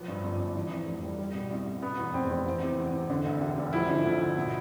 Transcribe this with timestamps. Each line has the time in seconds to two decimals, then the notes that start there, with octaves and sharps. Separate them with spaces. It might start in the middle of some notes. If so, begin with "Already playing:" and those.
Already playing: B1 F3 B3
0.08 G2
0.24 G1
0.40 G1
0.55 E3
0.71 F2
0.87 F1
1.04 G3
1.18 G3
1.34 B2
1.51 C2
1.66 C2
1.82 B2 B3
1.99 E2
2.14 F1 C4
2.30 F1
2.46 E3
2.62 C3
2.78 E2
2.94 E2
3.10 D3
3.26 D2
3.41 E1
3.58 E1
3.73 F3 E4
3.89 D3
4.05 D2
4.22 D2
4.37 B2